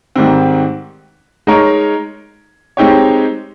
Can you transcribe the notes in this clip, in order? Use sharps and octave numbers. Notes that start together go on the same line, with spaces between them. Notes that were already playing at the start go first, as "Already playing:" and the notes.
G#2 D#3 G3 C4
G#3 D#4 A#4 C#5
G#3 C4 D#4 G4 C#5